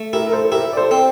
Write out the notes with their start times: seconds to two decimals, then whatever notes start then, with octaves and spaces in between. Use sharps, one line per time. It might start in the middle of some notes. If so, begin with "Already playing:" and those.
Already playing: A3
0.13 E4 G4 A#4
0.27 A#4
0.32 A4 C5
0.52 E4 G4 A#4
0.73 D5
0.77 A4 C5
0.91 C4